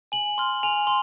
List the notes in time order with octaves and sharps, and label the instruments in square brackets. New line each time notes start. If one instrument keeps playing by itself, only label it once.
[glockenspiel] G#5 F#7
C6 F6
G#5 F7
C6